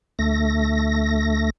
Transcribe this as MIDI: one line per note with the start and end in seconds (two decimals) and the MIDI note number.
0.19 1.50 38
0.19 1.50 57
0.19 1.50 94